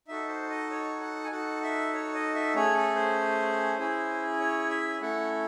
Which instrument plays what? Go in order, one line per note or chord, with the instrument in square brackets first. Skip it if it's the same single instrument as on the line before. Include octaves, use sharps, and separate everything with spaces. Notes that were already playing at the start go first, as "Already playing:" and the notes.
[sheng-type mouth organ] D#4 F#4 A4 E5
C5
D#5
C#5
F#5
G#5
D#4 F#4 A4 F#5
E5
C#5
D#5
E5
A3 C#4 G#4 C#5
A4
C5
C#4 E4 G#4
C#5
E5
A3 C#4 E4 A4 F#5